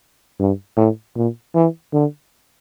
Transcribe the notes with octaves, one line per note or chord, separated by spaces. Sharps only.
G2
A2
A#2
E3
D3